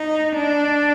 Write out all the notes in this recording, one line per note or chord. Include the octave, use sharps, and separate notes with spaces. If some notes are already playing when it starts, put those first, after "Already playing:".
Already playing: D#4
D4